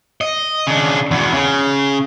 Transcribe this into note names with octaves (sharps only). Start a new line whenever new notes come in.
D#5
C#3 D4
E2 B2
C#3